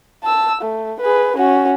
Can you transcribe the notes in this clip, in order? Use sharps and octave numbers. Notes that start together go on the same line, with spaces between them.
A5 E6
A3
G#4 B4
C#4 F#4